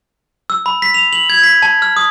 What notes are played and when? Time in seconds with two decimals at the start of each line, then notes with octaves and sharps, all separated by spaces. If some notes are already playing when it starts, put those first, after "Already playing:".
0.50 E6
0.66 B5
0.82 B6
0.94 F7
1.13 F#7
1.30 G#6
1.44 B6
1.62 A5
1.82 F6
1.97 D#6